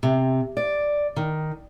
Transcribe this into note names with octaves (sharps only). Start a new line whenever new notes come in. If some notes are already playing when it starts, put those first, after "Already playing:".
C3
D5
D#3